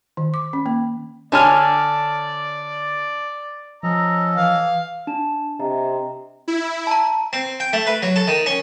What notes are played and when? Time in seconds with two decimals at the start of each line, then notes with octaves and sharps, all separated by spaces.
0.17 D#3
0.34 D6
0.53 C#4
0.66 A#3
1.32 D3 D4 C#5 D5 G#5 A5 F6
3.83 F3 C#4 A4 D#5 A#5
4.36 E3 F5
5.07 D4 A5 E7
5.60 C3 D#5 A#5
6.48 E4
6.87 A5 A#5
7.33 C4
7.60 G5
7.73 A3
7.87 B4
8.03 F#3
8.16 A4
8.28 D#3
8.46 C#4